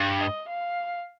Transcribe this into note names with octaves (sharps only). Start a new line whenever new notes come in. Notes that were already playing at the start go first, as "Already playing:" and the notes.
Already playing: G2
D#5
F5